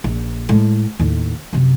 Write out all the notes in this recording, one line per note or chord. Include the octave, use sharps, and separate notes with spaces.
A#1
A2 G#3
D#2 A2
F#2 C3